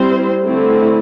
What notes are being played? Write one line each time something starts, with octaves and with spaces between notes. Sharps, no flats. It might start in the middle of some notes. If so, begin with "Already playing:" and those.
Already playing: G3 C4 E4 C5
D3 A3 C4 E4